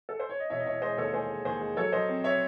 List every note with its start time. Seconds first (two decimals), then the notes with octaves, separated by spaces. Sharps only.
0.09 A4
0.20 C5
0.29 C#5
0.40 D#5
0.50 E1 C#5 E5
0.59 D#5
0.66 E1 C#5 E5
0.81 G#3 C5 D#5
0.97 D#2 A4 C#5
1.13 G#3 G#4 C5
1.29 G#3
1.45 D#2 G#4 C5
1.61 G#3
1.77 F#3 A4 C#5
1.92 F#3 C5 D#5
2.09 C4
2.24 C#5 E5